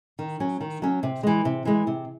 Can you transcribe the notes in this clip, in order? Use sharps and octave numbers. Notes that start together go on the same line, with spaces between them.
D#3
F#3 C#4
D#3
F#3 C#4
C3
E3 G#3
C3
E3 G#3
C3